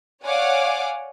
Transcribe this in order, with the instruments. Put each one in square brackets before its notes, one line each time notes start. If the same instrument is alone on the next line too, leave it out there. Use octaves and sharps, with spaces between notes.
[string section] C#5 D5 F5 F#5 G#5 D6